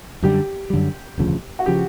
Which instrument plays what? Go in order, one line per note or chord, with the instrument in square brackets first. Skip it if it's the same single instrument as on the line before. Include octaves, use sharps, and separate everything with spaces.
[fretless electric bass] F#2 D3 G3 [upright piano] G4
[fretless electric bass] F#2 D3 G3
E1 D2 C#3 F3
[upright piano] F#4
[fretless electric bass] C#3 F3 [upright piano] G4